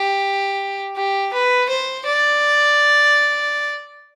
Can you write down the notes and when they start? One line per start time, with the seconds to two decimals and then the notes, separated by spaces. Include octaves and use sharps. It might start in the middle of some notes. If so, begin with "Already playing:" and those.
Already playing: G4
0.96 G4
1.33 B4
1.69 C5
2.06 D5